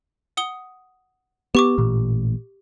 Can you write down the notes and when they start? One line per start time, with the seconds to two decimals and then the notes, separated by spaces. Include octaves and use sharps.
0.37 F#5 D#6 G7
1.55 B3 G4 C#6 D6
1.78 A1 A#2